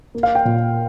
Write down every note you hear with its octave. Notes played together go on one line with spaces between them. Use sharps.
A#3
F5
G5
A#2